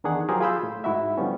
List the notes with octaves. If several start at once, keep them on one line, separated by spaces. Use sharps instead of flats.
E2 D#3 D4 G#4 F#5
F3 F#3 G4 G#4 A#4 C5
F4 G#4 B5 E6 G6
A2
G#2 E4 F#4 E5
D3 F3 G3 B3 C#4